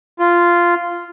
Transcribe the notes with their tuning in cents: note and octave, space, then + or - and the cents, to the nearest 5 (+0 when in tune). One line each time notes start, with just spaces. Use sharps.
F4 -10